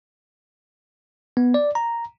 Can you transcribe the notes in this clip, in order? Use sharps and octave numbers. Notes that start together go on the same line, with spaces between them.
B3
D5
A#5